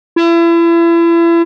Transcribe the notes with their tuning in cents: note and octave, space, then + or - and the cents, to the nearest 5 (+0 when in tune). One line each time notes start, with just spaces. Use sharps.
E4 +35